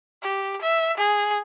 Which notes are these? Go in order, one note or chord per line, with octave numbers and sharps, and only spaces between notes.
G4
E5
G#4